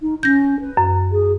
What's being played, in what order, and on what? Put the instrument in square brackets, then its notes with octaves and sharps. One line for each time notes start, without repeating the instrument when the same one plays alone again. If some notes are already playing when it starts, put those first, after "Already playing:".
[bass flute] D#4
[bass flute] C#4 [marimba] G6 A#6
[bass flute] B4
[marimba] F#2
[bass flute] G#4